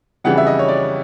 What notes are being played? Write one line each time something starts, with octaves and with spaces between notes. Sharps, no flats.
F2 C#3 E3 G3 F#5
E5
D#5
C#5
D5